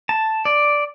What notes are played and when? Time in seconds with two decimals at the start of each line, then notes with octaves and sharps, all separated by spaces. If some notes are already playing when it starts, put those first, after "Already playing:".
0.09 A5
0.45 D5